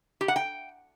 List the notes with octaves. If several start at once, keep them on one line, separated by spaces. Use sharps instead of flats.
G4
F#5
G5